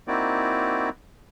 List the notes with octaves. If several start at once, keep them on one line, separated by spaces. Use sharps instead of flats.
A#3 C4 D#4 E4 F#4 D5